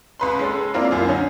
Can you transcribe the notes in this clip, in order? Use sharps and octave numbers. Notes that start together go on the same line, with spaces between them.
C#2 B4 C6
G#3 C#4 A4
A#3 C4 E4 F4 A#4 D5
C2 F#2 F4
D3 C#4 D#4